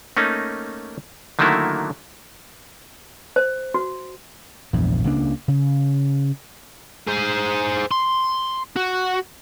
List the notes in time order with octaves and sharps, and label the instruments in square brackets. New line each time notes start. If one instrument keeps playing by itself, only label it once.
[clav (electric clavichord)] A3 A#3 C#4 D#4
D3 D#3 F#3 A3 A#3 E4
[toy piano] C5
F#4
[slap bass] A#1 E2 G2
C#2 C#3 A#3 D4
C#3
[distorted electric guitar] G#4 C5
C6
F#4